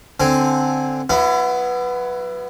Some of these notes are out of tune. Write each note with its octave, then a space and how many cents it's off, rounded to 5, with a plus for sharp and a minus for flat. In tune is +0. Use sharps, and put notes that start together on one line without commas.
D3 +0 C4 +0 G#5 +0
F#3 +0 B3 +0 E4 +35